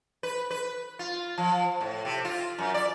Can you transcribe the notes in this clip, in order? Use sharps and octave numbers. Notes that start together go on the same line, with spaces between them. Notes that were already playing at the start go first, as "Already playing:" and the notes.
B4
B4
F4
F3
A2
C3
F4
F#2
D5